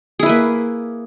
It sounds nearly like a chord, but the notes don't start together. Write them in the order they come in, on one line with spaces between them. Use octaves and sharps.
G#4 E4 B4 A#3